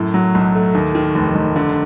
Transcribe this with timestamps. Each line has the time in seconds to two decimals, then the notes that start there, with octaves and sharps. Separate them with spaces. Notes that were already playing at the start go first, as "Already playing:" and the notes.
Already playing: F#2 A2
0.14 F#3
0.35 B1
0.55 A3
0.75 D#2
0.95 D#3
1.15 F1
1.36 F1
1.56 D3